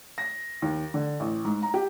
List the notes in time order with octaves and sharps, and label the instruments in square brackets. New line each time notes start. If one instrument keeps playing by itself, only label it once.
[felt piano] A#6
D#2
D3
A1
G#2
A#5
G4